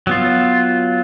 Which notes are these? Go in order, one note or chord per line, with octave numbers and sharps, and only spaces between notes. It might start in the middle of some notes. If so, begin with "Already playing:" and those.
F#3 B3 F4